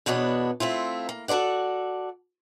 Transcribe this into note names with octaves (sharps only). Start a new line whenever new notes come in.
E2 B2 B3 D4 C#5
A3 C4 E4 F4
A#3
F#4 A4 C5 D5 F#5